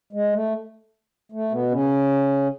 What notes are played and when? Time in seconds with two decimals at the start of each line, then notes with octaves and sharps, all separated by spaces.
0.13 G#3
0.33 A3
1.32 A3
1.52 B2 B3
1.71 C#3 C#4